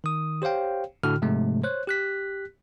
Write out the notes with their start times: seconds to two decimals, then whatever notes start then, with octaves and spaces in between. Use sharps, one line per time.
0.04 D#3 D#6
0.42 G4 C5 C#5 F5 G5
1.03 A2 D3 F#4 F6
1.22 G#2 C3 F3 G#3 A3
1.64 C5 C#5 F#6
1.87 G4 F#6 B6